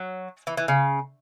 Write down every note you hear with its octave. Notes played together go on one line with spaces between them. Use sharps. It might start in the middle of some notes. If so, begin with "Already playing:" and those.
Already playing: F#3
E3
E3
C#3